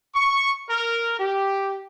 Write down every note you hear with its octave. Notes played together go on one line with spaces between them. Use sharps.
C#6
A#4
G4